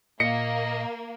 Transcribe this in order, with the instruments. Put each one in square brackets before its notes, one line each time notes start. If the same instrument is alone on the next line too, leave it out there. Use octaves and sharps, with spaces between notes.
[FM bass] A#2 [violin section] A#3 [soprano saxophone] D#5 [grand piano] C#7